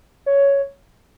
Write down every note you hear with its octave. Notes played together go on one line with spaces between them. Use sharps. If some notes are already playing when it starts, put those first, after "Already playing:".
C#5